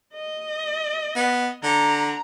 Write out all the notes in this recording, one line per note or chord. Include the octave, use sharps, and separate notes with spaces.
D#5
B3
D3 A#5